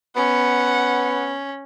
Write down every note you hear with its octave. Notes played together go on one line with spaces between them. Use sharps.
B3 C#4 F#5